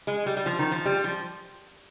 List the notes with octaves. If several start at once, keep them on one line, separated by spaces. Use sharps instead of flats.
G#3
G3
G3
F3
D#3
F3
G3
F3